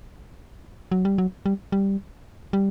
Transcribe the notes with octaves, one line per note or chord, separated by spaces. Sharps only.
F#3
G3
F#3
G3
G3
G3